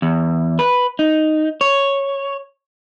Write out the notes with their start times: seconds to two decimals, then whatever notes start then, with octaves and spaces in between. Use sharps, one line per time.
0.02 E2
0.59 B4
0.99 D#4
1.61 C#5